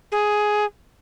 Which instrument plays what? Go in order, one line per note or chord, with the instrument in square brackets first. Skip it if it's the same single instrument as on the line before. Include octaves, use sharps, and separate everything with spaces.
[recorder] G#4